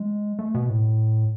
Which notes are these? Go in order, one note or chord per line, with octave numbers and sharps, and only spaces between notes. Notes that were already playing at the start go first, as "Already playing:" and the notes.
Already playing: G#3
A3
B2
A2